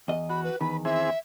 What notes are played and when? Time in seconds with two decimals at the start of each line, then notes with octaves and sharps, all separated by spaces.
0.08 E2 D#5
0.30 F#4 B5
0.44 B4
0.61 E2 D#3 B4 B5
0.85 E3 C4 G#4 E5